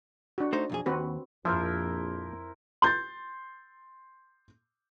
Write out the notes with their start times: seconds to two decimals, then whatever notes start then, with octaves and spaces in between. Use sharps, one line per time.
0.38 D4 F#4
0.53 A3 D#4 C5
0.70 B1 F2 G#4
0.86 D#2 C4 F#4 B4
1.45 A#1 F2 F3 E4 A#4 C5
2.82 C6 G6 A6